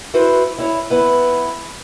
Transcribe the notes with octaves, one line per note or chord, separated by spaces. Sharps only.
E4 F#4 B4 C5
E4 C#5
B3 E4 B4